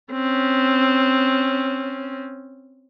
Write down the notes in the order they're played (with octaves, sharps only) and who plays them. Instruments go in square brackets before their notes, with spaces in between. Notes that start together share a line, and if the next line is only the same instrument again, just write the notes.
[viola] C4 C#4